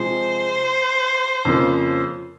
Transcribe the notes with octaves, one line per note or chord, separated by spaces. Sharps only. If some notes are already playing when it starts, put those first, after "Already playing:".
Already playing: C3 F3 G#3 C5
F2 C#3 F3 A#3